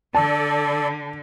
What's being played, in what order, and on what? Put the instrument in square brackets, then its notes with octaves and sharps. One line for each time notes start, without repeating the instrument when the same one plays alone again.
[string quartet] D3 [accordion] A4 D5 [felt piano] A5